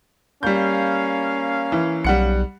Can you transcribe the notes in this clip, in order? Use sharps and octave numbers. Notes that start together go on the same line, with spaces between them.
G3 A#3 C#4 F5 G6
E3
B1 G3 F#5 C#7